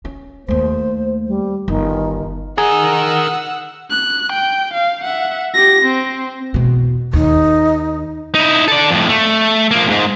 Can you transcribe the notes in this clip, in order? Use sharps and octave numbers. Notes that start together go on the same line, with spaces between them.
C#4
D#2 A3 C5
G3
G1 D#3
D#4 G#4 A#4 F#5 E6
F#6
G5
F5
E5 F#5
G4 A#6
C4
E2 B2
D#2 D#4
D#4 E4
A4 D5
F2 A2
A3
F3 A#3
E2 G#2